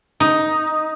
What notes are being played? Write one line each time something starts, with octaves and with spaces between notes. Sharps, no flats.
D#4